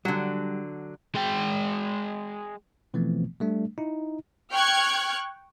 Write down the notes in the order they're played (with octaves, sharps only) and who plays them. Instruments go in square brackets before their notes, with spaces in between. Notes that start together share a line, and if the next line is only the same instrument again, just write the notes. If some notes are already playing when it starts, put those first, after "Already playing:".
[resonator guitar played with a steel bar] D3 F#3 [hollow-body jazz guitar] G3
[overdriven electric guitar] G#3 G5
[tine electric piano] B2 E3 F3 A3 B3 C4
G3 A3 D4
D#4 E4
[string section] G5 C#6 F6 F#6 G#6